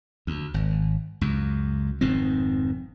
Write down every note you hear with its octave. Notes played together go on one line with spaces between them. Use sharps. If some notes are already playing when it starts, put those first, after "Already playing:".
D2
G#1
C#2 F#2
F1 G#2 D#3 C4